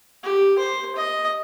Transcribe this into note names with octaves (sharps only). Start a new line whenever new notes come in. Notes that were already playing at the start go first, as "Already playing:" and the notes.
G4
C5
D#5